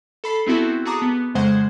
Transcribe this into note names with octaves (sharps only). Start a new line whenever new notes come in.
A4 B5 C7
B3 C4 E4 F#4 A4
F#4 G#4 A5 A#5 D6 D#6
B3
F2 C#3 G#3 C5 F#5 G#6